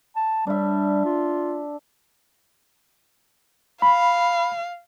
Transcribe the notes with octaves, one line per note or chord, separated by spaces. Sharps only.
A5
G3 D4 E5
F4
F5 B5